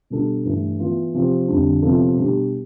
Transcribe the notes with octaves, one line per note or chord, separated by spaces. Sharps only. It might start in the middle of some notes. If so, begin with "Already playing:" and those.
B2 G3 D4 A4
G2 E3 A3
E3 B3 F4
C3 F3 C4 G4
F2 D3 G3 D4
C3 F3 B3 E4 A4
B2 G3 D4 G4